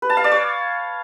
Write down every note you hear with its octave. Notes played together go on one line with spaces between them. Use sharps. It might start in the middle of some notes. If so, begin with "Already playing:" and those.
B4
A5
F5
D5
C#5